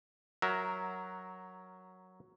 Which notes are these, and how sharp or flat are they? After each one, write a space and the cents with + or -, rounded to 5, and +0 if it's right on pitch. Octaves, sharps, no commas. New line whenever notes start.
F#3 +0 A#4 +0 E5 -10